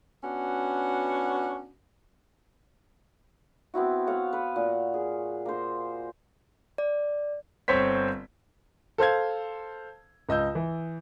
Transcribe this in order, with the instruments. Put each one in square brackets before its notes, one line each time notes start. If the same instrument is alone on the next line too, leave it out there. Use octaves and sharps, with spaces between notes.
[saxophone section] B3 C#4 D4 F#4
[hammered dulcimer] B3 C4 E4 F#4
C#5 F5 F#5
B4
A#2
G#4
A#3 C5
[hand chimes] D5
[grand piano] G1 C4 C5 C#5 B6
A4 C5 F5 G#6
C#2 D#5 E6 G6
E3